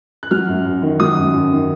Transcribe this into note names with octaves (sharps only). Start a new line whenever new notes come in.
F#6
F#3 F6
F#2
F#2
D#3
F#3 D#6
F#2
F#2
D#3